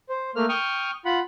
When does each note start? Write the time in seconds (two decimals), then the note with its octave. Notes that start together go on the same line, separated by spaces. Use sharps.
0.09 C5
0.36 A3 A#3 F6
0.49 G5 C#6 D#6 F6
1.05 F4 F#5 B5